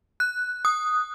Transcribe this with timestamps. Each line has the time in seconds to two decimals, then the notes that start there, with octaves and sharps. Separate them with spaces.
0.20 F#6
0.65 D#6